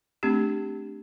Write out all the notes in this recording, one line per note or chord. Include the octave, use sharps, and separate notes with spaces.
A3 C4 D4 G4